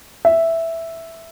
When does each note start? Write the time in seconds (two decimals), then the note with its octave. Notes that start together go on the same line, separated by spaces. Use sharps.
0.25 E5